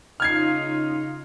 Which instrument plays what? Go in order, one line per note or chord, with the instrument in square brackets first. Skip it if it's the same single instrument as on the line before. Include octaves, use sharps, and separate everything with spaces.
[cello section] C#3 D#4 F4 [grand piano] F6 G#6 C7